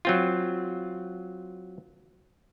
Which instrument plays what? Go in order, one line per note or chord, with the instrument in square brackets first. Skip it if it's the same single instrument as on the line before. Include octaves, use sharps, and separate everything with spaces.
[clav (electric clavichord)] F#3 C4 F4